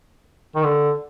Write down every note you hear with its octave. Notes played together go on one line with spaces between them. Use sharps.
D#3
D3